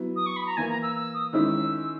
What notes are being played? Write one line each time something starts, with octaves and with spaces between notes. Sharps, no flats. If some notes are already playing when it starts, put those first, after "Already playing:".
Already playing: F#3 B3 E4
D#6
C#6
B5
A#5
E3 A#3 E4 G#5
A#5
E6
E6
D#6
D#3 G#3 C#4 E4 E6